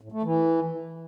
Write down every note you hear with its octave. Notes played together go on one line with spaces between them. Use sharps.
A2
A3
E3